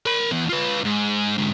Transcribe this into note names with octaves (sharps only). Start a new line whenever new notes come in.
A#4 B5
E3 B3
F4 B4
G#2
G#2 D3